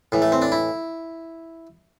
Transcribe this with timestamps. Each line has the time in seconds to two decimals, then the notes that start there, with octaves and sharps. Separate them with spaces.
0.12 A2 E3
0.22 A3
0.32 C4
0.42 D4
0.52 E4